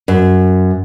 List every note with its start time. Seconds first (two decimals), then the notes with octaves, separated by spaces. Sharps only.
0.08 F#2